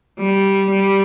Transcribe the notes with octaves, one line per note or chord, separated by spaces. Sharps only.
G3
G3